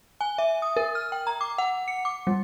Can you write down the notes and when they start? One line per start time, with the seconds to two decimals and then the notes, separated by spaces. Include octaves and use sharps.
0.21 G#5
0.38 E5
0.62 D#6
0.76 A#4
0.95 F6
1.12 G5
1.27 A#5
1.41 D6
1.58 F#5
1.88 C#7
2.05 D6
2.27 G3